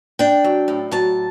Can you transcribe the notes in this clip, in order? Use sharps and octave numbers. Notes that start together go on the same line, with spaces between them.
D4 G5
F#3
A2
F#3 A5